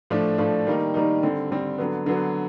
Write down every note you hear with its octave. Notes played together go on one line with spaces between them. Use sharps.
A2 F3 A3 D4
A2 F3 A3 D4
D#3 G3 A#3 D#4
D#3 G3 A#3 D#4
D3 G3 C4
D3 G3 C4
D3 F#3 B3
D3 F#3 B3